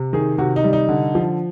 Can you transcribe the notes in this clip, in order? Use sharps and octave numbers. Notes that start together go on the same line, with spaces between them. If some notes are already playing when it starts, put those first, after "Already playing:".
Already playing: C3
D#3 G#4
C3 F#4
D#4
G3
D#4
D3
F3